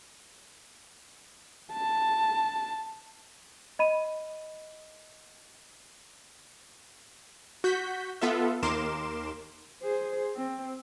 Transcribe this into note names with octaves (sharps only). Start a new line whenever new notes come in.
A5
D#5 B5 D#7
F#4 G6 B6
B3 F4 A4 E5
D#2 A#4 C6 D6 E7
G#4 C5
C4